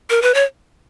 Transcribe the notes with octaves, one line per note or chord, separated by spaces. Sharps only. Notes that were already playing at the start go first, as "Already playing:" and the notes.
A#4
B4
C#5